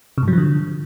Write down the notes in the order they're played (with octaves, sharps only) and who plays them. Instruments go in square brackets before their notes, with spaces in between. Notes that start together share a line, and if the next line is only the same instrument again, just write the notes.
[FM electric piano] C3
G#2
F#3
F3
D3